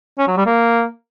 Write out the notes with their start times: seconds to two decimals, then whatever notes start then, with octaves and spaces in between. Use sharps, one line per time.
0.19 C#4
0.28 F#3
0.37 G3
0.46 A#3